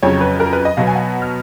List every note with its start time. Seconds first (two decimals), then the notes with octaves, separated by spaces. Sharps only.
0.02 F2 C#3 F#3 C#5
0.21 B4
0.40 A#4
0.53 B4
0.65 D#5
0.77 B2 F#3 B3 F5
0.87 G#5
0.96 F#5
1.22 F6